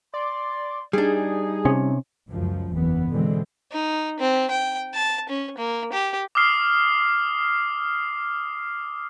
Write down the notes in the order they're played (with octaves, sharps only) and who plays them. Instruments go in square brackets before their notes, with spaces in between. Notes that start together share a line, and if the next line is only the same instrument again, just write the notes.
[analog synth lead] D5 [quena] C6
[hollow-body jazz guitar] G3 D4 [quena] D#4 [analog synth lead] G#4
[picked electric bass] C3 C#4
[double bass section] C#2 F#2 F3
F#1 E2 E3 B3
B2 D3 E3 G#3 C4
[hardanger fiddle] D#4
C4
G5
A5
C#4
A#3
G4
[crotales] D6 D#6 F6 C7